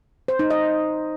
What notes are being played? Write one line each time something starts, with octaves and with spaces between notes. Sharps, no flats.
C5
D#4
D#5